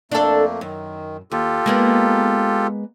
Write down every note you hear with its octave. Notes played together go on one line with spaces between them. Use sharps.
F2 A3 A#3 D4 A4
F#2 D#3
D#2 F4 G4 A4
G#3 A#3 B3